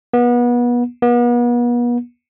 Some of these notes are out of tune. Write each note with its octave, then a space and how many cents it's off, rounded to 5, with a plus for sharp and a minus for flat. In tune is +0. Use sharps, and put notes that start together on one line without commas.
B3 -30
B3 -40